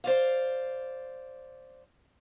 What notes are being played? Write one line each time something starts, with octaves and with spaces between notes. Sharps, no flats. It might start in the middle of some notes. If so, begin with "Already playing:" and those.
C5 D5 F5